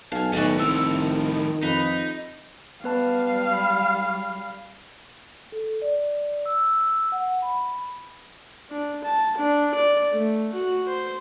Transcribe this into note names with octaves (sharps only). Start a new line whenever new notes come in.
B1 F5 G#5 A5
B1 A2 D#3 F#4 D5 D#5
C2 A2 F3 E6
F2 D#4 B4 B5
G3 B3 B4 F5 A5
B5 F6
A4
D5
E6
F#5
B5
D4
A5
D4
D5
A3
F#4
C5